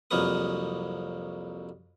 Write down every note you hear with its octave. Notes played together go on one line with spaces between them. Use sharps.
C2 F2 F#3 A#3 B4 D#6